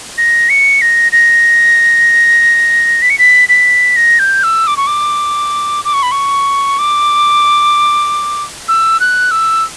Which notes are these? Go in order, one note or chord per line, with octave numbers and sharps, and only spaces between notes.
A#6
C#7
A#6
A#6
B6
C#7
B6
B6
A#6
G6
E6
D6
C#6
D6
D6
C#6
B5
C#6
D6
E6
F#6
E6